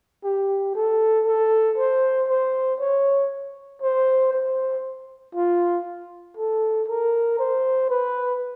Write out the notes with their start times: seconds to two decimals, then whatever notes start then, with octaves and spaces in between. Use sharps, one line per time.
0.24 G4
0.75 A4
1.26 A4
1.77 C5
2.28 C5
2.80 C#5
3.82 C5
4.32 C5
5.35 F4
6.37 A4
6.88 A#4
7.39 C5
7.90 B4